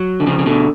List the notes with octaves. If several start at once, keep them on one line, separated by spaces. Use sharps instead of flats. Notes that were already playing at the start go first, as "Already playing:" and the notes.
Already playing: F#3
D3
C#3 F3
C#3
B2 D3